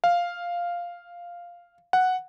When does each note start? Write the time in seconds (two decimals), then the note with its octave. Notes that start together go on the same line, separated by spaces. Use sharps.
0.04 F5
1.93 F#5